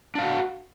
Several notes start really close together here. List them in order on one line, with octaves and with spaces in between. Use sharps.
D4 F5 F#4